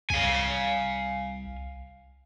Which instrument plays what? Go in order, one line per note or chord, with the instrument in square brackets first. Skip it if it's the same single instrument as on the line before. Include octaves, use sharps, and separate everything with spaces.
[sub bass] C2 [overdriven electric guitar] F5 G#5